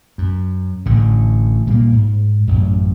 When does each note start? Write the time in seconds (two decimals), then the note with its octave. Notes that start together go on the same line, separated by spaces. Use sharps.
0.18 F#2
0.86 A1 A2 D3
1.67 A#2 G3 A#3
1.92 G#2
2.47 A1 F#2